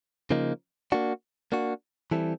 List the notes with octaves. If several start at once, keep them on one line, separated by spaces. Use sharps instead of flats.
C#3 F3 A#3 D#4
A#3 D4 F#4
A#3 D4 F#4
E3 G3 C4 E4 A4